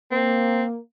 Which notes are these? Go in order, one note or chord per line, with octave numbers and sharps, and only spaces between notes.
A#3 C4